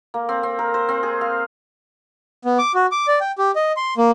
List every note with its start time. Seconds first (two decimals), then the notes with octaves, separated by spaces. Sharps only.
0.14 A#3
0.29 C4
0.43 C4
0.59 A#4
0.74 C5
0.89 C4
1.03 G#4
1.21 F5
2.45 B3
2.58 D6
2.75 F#4
2.92 D6
3.08 D5
3.20 G5
3.38 G4
3.56 D#5
3.77 C6
3.98 A#3